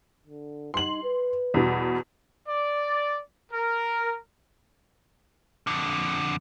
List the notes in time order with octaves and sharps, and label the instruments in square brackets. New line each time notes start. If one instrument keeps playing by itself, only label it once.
[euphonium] D3
[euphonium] D#4 [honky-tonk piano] C6 F#7
[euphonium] B4
[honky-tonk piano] E2 B2
[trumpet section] D5
A#4
[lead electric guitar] F2 D3